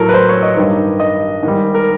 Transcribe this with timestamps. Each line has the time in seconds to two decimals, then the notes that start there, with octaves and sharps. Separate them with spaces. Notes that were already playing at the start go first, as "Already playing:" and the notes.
Already playing: A2 F#3 A4 A#4
0.09 B4
0.14 C5
0.29 C#5
0.43 D#5
0.57 G2 D#3 G3
1.00 D#5
1.43 G#2 D#3 G3
1.75 A#4